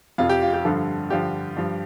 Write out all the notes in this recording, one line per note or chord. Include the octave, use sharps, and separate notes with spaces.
F2 C3 F3 F4
G4
F4
G4
G2 D3 F3 A4
G2 D3 F3 G4
G2 F3